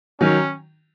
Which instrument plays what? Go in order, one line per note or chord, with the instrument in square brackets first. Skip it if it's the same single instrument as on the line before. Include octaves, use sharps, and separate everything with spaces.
[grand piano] D#3 F#3 [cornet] C#4